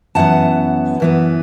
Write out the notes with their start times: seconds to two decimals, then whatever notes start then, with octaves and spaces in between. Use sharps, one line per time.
0.15 F#2 E3 B3 F#5 A5
1.00 F#2 E3 B3